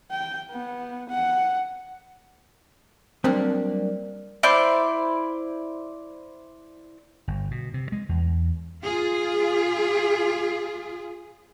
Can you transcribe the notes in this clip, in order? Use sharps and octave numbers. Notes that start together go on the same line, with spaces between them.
G5
B3
F#5
F#3 G3 A#3 C4 D4 A#4 D5
E4 C5 D5
G1
B2
C3
G#3
E2
F4 G#4